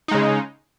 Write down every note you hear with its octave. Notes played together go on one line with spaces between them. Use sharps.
C#3 G#3 D#4